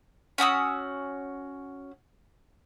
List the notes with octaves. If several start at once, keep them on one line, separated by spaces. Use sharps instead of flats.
C#4 F#4 D#6 E6